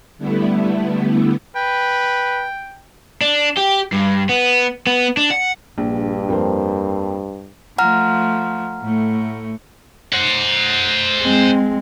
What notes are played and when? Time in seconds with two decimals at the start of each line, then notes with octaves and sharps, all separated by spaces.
0.18 D3 G3 A3 B3 E4
1.55 B4 G5
3.21 D4
3.57 G4
3.92 G2
4.29 B3
4.87 B3
5.17 D4
5.30 F#5
5.78 A#1 G2
6.29 F2 A#3 C5
7.78 F3 A3 F#5 A#5 F6
8.82 A2 A3
10.13 C5 F#5
11.22 G#3 C4